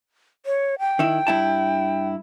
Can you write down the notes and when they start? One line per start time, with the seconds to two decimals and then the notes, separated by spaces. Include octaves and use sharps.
0.46 C#5
0.79 G5
0.99 D#3 E4
1.27 G2 E4 A5